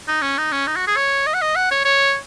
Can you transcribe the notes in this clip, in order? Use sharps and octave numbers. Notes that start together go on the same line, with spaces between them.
D#4
C#4
D#4
C#4
D#4
F#4
G#4
C#5
D#5
F#5
D#5
F#5
C#5
C#5